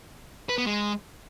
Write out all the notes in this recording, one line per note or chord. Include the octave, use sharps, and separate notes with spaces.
B4
B3
G#3